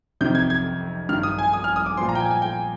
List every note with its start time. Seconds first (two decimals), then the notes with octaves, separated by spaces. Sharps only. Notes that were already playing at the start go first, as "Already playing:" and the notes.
0.21 F2 C3 D#3 G6
0.35 G#6
0.50 G#6
1.09 G2 D#3 F6
1.23 D#6
1.39 G#5
1.53 D#6
1.64 F6
1.76 D#6
1.86 D6
1.97 F3 C6
2.01 A#2
2.09 A#5
2.15 G5
2.20 G#5
2.31 G#5
2.42 G5